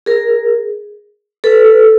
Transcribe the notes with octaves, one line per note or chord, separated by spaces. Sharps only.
G#4 A#4
A4 B4